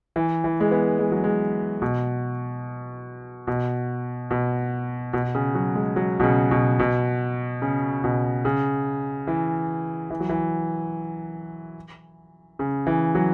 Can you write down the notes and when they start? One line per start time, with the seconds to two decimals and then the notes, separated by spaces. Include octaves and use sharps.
0.16 E3
0.44 E3
0.60 G#3
0.71 B3
0.99 G#3
1.12 F#3
1.24 G#3
1.82 B2
3.47 B2
4.31 B2
5.13 B2
5.35 C#3
5.55 F#3
5.75 G#3
5.96 F#3
6.20 B2
6.23 C#3
6.51 B2
6.79 B2
7.62 C#3
8.04 B2
8.45 C#3
9.27 E3
10.10 E3
10.20 F#3
10.30 E3
12.59 C#3
12.87 E3
13.15 F#3